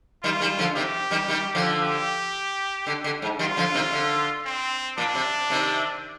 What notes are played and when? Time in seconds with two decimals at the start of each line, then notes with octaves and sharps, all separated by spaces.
0.23 D#3 G3 F4
0.41 D#3 G3
0.58 D3 F3
0.76 C3 D#3 G4
1.11 D#3 G3
1.28 D#3 G3
1.55 D3 F3
1.82 G4
2.87 D3
3.04 D3
3.22 G#2
3.39 D#3 G3 F4
3.57 D3 F3
3.74 C3 D#3
3.92 D3
4.45 C4
4.98 A#2 D4
5.15 C3
5.50 C3 D#3